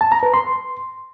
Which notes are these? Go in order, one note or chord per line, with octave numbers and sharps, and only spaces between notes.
A5
A#5
B4
C6